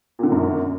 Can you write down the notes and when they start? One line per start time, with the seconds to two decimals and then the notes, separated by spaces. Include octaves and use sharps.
0.19 A#2
0.23 D3
0.27 D#3
0.32 F#2